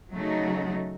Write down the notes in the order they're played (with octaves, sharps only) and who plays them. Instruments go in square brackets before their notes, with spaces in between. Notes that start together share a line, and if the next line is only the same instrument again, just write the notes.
[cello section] C#3 F#3 A3 D#4 F#4